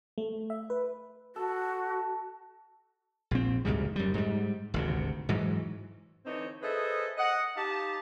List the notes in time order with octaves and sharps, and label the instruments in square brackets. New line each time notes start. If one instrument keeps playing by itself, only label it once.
[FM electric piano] A3
E5
B4
[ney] F#4 [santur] A4
[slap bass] A#1 C4
D2 G#2 C#3 G3
F#2 G3
G#2 G3
G#1 D2 C3
G#2 E3 F#3
[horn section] D3 E3 C4 D#4 C#5
G#4 A4 B4 C5 D#5 E5
D#5 F#5
D#4 G4 F5 A5